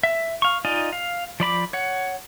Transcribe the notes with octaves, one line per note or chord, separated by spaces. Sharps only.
E5
F5 C#6
D#4 F4 D5 D#5 G#5
F5
F3 D5 B5 D6
C#5 F#5